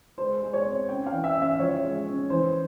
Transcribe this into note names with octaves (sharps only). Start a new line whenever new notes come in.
G#3 C5
G#3
C#5
C4
C#4 G5
F5
E3
E5
C#4
E5
F3 C#5
G#3
C#4
E3 C5